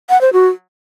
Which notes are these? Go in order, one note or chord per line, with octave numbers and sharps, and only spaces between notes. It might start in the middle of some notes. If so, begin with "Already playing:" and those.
F#5
C5
F#4